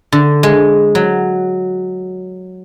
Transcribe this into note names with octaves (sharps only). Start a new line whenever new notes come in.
D3
G#3
F#3